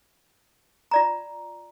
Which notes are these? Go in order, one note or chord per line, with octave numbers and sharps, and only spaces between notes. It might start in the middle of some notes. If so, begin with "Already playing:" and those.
F4 D5 A#5